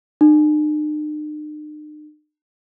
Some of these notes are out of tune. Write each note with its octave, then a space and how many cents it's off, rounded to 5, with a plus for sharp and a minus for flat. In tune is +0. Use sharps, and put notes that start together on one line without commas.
D#4 -45